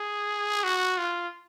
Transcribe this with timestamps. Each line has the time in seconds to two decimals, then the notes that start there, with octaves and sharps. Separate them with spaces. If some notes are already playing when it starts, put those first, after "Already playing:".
Already playing: G#4
0.64 F#4
0.98 F4